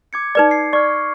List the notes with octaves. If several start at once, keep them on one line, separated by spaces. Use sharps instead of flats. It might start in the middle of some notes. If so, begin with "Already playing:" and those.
D6 G#6 C#7
D#4 B4 D5
C7
D5 C#6 F6